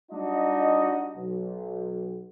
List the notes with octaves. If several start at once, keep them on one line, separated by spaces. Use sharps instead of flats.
G3 D4 D#4 F#4 D#5
B1